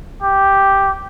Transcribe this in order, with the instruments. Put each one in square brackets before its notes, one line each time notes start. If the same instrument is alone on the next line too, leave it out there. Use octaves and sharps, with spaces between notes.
[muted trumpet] G4